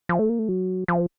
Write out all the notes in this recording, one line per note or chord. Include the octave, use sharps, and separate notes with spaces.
F3
A3
A#3
A3
F#3
F3